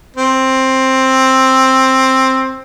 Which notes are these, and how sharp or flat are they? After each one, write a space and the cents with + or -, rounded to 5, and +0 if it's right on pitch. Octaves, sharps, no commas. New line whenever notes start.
C4 +10